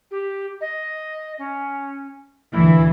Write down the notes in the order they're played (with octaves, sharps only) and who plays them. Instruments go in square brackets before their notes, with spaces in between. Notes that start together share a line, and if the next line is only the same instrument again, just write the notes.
[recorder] G4
D#5
C#4
[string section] D2 A#2 E3 [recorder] E4